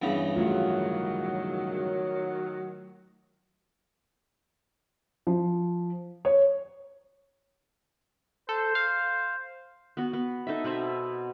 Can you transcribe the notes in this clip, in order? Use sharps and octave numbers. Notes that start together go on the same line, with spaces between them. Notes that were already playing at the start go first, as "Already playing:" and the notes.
E2 G2 C#3
D#3 F#3 A3 F4
F3
C#5
A4 C5
F5
B3 F#4
B3
D#4 A4 D#5 E5
B2 B3 C4 E5